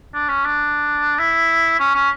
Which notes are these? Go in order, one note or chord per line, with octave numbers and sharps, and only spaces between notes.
D4
C#4
D4
E4
C#4
C#4